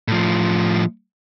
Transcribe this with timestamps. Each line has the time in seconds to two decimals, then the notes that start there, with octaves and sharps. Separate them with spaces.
0.08 A2 F3